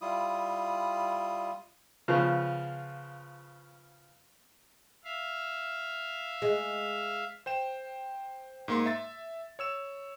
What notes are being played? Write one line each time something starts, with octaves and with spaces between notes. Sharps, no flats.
G3 E4 F4 D#6
C#3 F3 B3
E5 F5
G#3
C5 G5 E7
G#2 A#3 C6
E5 A6
C#5 E6 E7